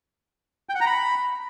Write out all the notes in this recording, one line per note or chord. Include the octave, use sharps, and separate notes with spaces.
G5
F#5
A#5
B5